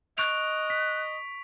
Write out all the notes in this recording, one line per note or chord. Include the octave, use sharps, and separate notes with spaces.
D#5 C#6 F#6 D7 F7
B6